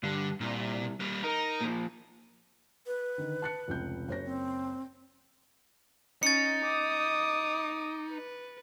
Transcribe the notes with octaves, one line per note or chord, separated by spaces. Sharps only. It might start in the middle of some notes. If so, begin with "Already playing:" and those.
G2 D3
C2 A#2
G3 A#3
D#4 A#4
A#2 F3
B4
D3 D#3
A5 F#6 C#7
F1 C#2 G6
F#1 C5 C#5 A#6
C4
C#4 D#4 A6 C#7
D6 D#6
B4